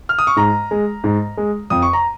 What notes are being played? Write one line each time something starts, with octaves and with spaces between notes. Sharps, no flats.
F6
D#6
C#6
G#2 A#5
G#3
G#2
G#3
F2 D#6
C#6
A#5